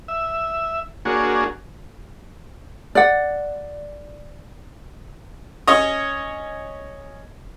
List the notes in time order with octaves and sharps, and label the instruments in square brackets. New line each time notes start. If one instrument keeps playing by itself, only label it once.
[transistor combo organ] E5
A#3 D4 F#4 G#4 C#5
[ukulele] D5 F#5
[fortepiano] C#4 C#5 D#5